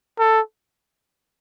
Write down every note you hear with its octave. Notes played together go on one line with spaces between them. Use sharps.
A4